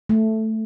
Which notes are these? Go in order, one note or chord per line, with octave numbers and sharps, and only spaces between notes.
A3